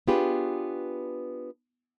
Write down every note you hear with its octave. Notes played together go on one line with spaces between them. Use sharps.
B3 D4 F4 G4 G#4 B4